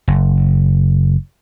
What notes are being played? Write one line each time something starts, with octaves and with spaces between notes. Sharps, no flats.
F#1